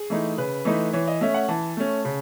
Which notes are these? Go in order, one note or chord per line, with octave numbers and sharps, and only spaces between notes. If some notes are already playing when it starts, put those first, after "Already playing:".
Already playing: G#4
E3 A3 D#4
C#3 B4
E3 A3 D#4
E3 C#5
D#5
A3 C#4 E5
F#5
E3 A5
A3 C#4
C#3